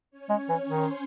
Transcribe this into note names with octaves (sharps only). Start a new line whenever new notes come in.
C#4 C#5
G#3
E3
D#3 C5 C6